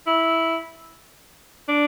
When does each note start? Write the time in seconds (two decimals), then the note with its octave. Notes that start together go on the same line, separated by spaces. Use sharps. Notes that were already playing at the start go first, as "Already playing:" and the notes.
0.07 E4
1.69 D4